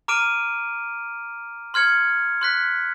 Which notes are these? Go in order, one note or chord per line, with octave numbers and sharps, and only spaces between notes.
A#5 D6 F6 D7 D#7
C6 F6 G#6 C#7
C6 F#6 B6